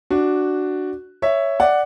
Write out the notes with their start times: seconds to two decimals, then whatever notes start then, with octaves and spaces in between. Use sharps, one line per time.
0.10 D4 F#4
1.22 C#5 E5
1.60 D5 F#5